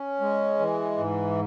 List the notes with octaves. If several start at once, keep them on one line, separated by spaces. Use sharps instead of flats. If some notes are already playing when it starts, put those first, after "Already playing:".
Already playing: C#4
G#3
E3
G#2